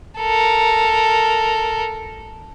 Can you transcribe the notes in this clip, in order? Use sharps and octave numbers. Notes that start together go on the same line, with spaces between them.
A4 A#4